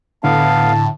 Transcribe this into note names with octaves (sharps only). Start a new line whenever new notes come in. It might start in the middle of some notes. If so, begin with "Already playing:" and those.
A2 D3 B3 F5 A5